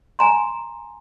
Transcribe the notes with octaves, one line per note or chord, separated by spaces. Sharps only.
G#5 A#5 C6